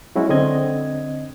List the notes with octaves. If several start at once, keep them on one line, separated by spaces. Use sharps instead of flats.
F#3 G#3 C#4 E4 F#4
D3 C4 D#5 G#6